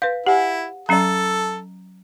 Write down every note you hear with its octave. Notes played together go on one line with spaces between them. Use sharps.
B4 F5 G6
E4 G4 F#5 G#5
F#3 C#4 A4 D#5 A#5